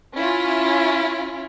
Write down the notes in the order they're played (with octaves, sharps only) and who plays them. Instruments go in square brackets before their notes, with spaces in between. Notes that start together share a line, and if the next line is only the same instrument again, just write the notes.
[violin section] C#4 E4 F4